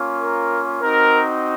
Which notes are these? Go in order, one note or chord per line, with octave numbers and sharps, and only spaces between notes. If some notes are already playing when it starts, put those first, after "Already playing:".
Already playing: A#3 C#4 F4
A#4
C4 D#4 F#4 A#4